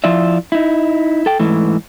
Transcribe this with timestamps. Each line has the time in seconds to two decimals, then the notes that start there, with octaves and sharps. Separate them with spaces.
0.04 F3 E4 F4 D5 E5
0.52 D#4 E4
1.26 A4 G5
1.39 G#2 E3 A3